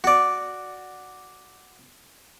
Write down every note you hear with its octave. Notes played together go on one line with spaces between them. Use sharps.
F#4 D5